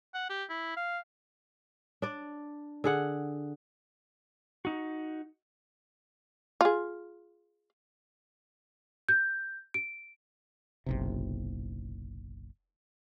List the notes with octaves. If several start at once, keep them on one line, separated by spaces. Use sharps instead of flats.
F#5
G4
E4
F5
D4 D5
D3 G#4 F#5
D#4 F#4
F4 G#4
G6
D7
F#1 B1 C3